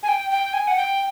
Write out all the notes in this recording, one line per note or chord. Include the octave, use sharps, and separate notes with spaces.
G#5
G5
G5
G#5
F#5
G5